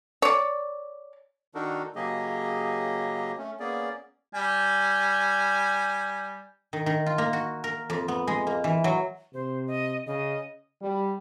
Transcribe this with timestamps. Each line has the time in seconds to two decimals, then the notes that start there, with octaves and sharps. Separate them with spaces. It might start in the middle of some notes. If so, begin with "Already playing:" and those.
0.22 C#5 D5
1.55 D#3 D4 D#4 F#4 A4 A#4
1.96 C#3 F#3 A#3 G4 G#4 D#5
3.38 A3 C#4
3.60 A#3 B3 C#4 G#4 D5
4.35 G3 G#5
6.73 D#3
6.86 D#3
7.06 F4
7.18 A#3
7.33 F#4
7.64 A#4
7.90 F2
8.08 B3
8.27 G#3
8.47 A#3
8.64 E3
8.84 F#3
9.34 C3 C5
9.67 D#5
10.07 C#3 D#5
10.82 G3